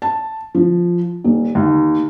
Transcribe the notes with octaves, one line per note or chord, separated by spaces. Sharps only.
A5
F3
D#1
D#2